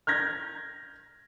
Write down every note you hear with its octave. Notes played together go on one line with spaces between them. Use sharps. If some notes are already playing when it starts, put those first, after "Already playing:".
F6 G6 G#6 A#6